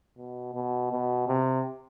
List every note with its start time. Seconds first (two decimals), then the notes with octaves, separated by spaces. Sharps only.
0.18 B2
0.55 B2
0.92 B2
1.28 C3